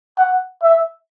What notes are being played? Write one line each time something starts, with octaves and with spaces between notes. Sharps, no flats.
F#5
E5